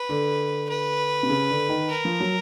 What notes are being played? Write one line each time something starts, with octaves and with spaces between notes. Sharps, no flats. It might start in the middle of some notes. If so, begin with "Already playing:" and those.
Already playing: B4
D3
B4
C3
C#3
D3
D#3
A#4
F3
F#3